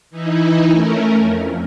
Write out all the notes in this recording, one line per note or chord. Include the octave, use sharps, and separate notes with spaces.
E3 D#4 E4
A3 C#4 A#4
F2